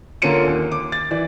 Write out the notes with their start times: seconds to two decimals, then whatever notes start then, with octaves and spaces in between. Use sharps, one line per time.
0.22 D3 A#3 C#4 F4 C#7 D#7
0.47 D#2
0.72 D6
0.92 A6
1.11 E3 D5